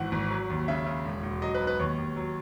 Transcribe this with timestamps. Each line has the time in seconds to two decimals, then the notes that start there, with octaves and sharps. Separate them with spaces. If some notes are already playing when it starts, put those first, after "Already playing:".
Already playing: G#1 E3 F#5
0.12 G#1
0.31 F#3
0.50 D#2
0.68 C#3 E5
0.86 C#3
1.05 E1
1.23 E1
1.42 F#3 D#5
1.54 B4
1.60 B1
1.67 B4
1.79 D#2 C#5
1.98 D#2
2.16 F#3